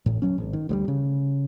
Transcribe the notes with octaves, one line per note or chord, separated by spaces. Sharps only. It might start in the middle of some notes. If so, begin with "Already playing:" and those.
A1 A2
D1 F2 F#3 C#4
G#1
D#3
D2 F#3 G3
C#3